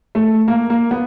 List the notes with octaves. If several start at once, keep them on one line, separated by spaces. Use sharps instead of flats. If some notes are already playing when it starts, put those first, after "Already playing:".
A3
A#3
A#3
B3